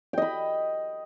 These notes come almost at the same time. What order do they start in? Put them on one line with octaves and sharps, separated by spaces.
G5 D#5 B5